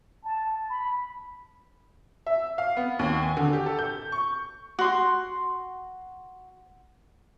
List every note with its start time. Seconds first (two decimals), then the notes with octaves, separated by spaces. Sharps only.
0.23 A5
0.69 B5
2.27 E5
2.58 F5
2.77 B3
2.99 D#2
3.22 G#5
3.37 D3
3.53 G4
3.66 A4
3.79 G6
4.12 C#6
4.79 F#4 C6